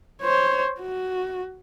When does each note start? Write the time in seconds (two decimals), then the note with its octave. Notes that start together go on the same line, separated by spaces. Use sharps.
0.22 C5 C#5
0.80 F#4